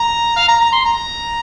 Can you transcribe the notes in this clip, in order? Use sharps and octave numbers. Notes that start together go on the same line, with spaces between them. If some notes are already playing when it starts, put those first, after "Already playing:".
Already playing: A#5
F5
A#5
A#5
C6
A#5